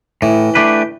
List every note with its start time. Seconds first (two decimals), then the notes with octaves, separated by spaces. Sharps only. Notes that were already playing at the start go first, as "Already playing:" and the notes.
0.22 A2 E3
0.55 A3 D4 G4 B4